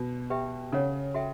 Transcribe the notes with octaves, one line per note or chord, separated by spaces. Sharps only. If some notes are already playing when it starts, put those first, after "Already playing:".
Already playing: B2
G4 B4 E5 G5
C#3 A4 C#5 F#5
F#4 A4 E5 G5